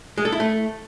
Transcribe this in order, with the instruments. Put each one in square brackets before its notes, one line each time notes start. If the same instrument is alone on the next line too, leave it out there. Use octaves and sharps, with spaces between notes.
[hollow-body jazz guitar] G#3
A4
E4
A3